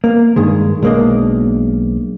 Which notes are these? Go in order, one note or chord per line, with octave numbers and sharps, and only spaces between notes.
A#3
G2 D#3 G#3
B1 G#3 A#3 D4 D#5